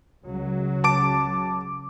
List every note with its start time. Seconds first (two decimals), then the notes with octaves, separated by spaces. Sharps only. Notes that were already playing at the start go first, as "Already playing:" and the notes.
0.25 C#2 C#3 F#3
0.84 A5 D6 D7